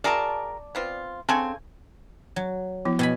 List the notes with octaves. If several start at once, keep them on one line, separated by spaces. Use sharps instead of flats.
F#4 G#4 A#4 D5 A5
B3 C4 F4
C#3 C4 A4 G#5
F#3
F3 B3 E4
B2 B3 G#5 B5